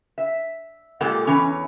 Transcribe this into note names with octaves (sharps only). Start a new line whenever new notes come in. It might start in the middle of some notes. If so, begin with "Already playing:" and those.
E5
A#2 G#3 G4 A4 F#5
E2 E3 C#4